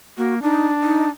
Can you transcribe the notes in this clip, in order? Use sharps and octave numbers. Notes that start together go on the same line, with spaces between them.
A#3 F#4
D4 D#4
D#4